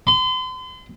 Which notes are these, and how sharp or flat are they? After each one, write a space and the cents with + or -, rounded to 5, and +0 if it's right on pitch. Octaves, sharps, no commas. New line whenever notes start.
C6 -40